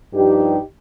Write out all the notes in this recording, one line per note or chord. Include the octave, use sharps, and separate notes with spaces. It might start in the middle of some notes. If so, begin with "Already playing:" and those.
G2 F3 D#4 G4